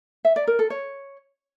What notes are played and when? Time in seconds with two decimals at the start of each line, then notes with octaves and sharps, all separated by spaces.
0.25 E5
0.36 D5
0.47 A#4
0.59 A4
0.70 C#5